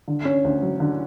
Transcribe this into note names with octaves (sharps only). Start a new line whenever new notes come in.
D3
C#4
D2
F#3
D3